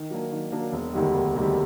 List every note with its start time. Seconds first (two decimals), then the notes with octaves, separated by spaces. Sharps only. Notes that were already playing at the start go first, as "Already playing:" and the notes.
Already playing: D#3
0.11 F#3 A#3 D4
0.31 D#3
0.52 F#3 A#3 D4
0.72 E1
0.93 D2 C3 D#3 G3
1.14 E1
1.35 D2 C3 D#3 G3